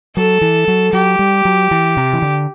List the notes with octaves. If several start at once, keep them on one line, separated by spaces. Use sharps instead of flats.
F#3 A4
E3
F#3
F#3 G4
G3
F#3
E3
C3
E3
D3